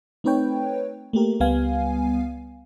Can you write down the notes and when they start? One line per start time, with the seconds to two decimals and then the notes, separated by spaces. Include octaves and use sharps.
0.24 A3 C4 D#4 B4 C#5 G5
1.13 A3 A#3 G4 A#4
1.40 C#2 G3 B3 F5 G#5